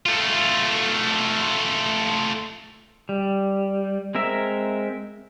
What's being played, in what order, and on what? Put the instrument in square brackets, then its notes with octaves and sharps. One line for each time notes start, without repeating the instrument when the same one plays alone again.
[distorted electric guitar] A3 F4
[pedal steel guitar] G3
G#3 C4 A#4 E5